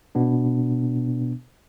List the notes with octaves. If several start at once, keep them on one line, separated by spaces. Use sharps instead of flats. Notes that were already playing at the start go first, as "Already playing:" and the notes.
B2 B3 D4